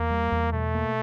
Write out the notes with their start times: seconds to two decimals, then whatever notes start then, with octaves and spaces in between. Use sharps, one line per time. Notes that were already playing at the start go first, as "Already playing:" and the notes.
Already playing: E2 A#3
0.10 G3
0.32 E2
0.53 B2 A3
0.75 A#3